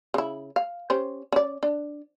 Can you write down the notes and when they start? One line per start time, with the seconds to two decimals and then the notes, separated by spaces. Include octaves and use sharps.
0.14 C#3 E4
0.56 F5
0.90 C#4 G4 C5
1.32 C#4 D5
1.63 D4